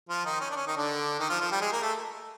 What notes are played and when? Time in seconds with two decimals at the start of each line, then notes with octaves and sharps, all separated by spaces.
0.09 F3 F4
0.25 D#3 D#4
0.41 C#4
0.51 D4
0.56 C#4
0.67 D#3 D#4
0.77 D3 D4
1.19 D#3 D#4
1.30 F3 F4
1.40 F3 F4
1.51 G3 G4
1.61 G#3 G#4
1.72 A#3 A#4
1.82 A3 A4